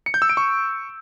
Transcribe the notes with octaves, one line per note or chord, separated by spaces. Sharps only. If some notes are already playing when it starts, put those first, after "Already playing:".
C#7
G6
E6
D7
C#6